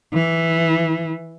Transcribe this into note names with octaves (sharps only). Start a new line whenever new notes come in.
E3